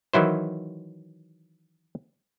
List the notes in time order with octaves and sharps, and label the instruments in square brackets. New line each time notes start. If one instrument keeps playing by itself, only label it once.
[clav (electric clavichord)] D#3 E3 F#3 E4 C5